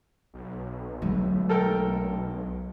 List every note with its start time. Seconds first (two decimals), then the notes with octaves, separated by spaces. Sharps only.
0.34 B1
1.02 D3 F#3 G#3 A3
1.49 A4 A#4 G5